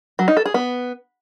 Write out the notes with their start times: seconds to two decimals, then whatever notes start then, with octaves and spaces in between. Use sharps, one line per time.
0.19 F#3
0.28 D#4
0.37 A4
0.45 G#4
0.54 B3